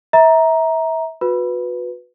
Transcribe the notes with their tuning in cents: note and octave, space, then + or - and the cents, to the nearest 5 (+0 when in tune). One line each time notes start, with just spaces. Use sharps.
E5 -25 A#5 +5
F#4 -35 B4 +0